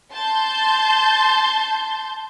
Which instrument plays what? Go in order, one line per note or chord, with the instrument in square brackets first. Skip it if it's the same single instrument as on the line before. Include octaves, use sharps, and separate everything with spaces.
[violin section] A5 C6 G6